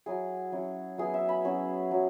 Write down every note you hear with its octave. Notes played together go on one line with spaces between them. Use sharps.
F#3 E4 G#4
F#3 C#4 E4
F#3 B3 E4 G#4
E5
B5
F#3 C#4 E4
F#3